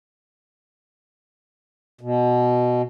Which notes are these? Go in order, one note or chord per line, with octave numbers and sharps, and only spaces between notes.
B2